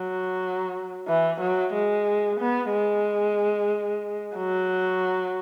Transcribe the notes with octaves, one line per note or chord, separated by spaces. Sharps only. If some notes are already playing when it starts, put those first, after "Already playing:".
Already playing: F#3
E3
F#3
G#3
B3
G#3
F#3